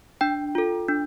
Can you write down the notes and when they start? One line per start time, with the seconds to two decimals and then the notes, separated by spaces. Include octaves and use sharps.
0.21 D4 G5
0.55 F4 A4
0.88 D4